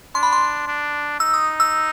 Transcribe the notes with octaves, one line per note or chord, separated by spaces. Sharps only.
D4 C6
B5
C6
D4
D#4 E6
D#6
E6